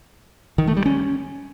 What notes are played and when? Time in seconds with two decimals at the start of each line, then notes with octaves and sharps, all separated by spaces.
0.58 D#3
0.67 A3
0.76 G3
0.86 C#4